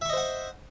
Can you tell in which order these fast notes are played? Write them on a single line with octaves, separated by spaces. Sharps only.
E5 C#6 D#5 C5 F#5